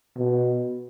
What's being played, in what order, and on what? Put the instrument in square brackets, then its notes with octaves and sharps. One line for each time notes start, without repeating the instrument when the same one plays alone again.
[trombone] B2